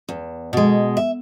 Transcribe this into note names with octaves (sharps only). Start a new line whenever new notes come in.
E2
B2 G#3
E5